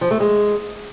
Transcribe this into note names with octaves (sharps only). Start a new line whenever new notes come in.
F3
A3
G#3